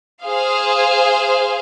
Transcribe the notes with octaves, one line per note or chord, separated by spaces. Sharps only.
G#4 C5 F5